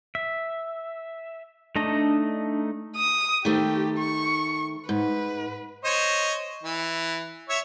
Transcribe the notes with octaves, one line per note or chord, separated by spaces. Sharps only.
E5
A3 D4 D#4 D#5
D#6
D#3 A3 G4 C5
C#6
G#2 B4
C5 C#5 D#5
E3
C#5 E5